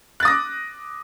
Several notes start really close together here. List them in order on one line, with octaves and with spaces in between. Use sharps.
F#6 A6 D#6 A#6 D6